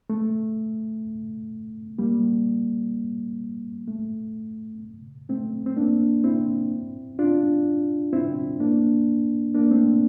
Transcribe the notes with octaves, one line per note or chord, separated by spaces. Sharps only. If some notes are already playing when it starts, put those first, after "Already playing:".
A3
G3 A#3
A3
A3 C4
C4
A#3 D4
C4 E4
D4 F4
C4 E4
A#3 D4
A#3 D4
A3 C4